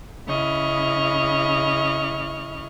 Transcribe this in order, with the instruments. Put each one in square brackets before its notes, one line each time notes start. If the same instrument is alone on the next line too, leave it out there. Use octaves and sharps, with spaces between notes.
[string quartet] C#3 E4 D#5 C#6 F6